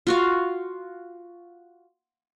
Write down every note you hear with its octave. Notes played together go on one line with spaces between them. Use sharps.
F4 F#4 F5